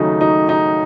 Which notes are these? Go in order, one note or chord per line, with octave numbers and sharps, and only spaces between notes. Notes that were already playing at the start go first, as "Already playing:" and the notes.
Already playing: D#2 C#3 F#3 A3 D#4
D#4
D#4